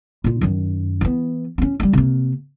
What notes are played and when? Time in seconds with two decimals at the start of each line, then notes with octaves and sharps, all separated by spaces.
0.24 A#2 F4
0.41 F#2 D#3
1.01 E3 B3
1.58 C4 C#4
1.80 G3 G#3
1.93 C3 A#3